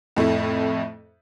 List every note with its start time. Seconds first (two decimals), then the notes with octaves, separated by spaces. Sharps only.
0.16 F2 A2 A3 E4